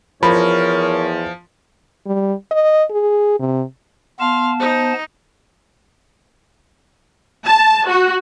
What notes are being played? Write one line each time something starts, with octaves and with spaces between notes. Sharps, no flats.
E2 F3 A#4 C#5 B5
G3
D#5
G#4
C3
B3 F5 A5 C6
D#4 C5
A5
F#4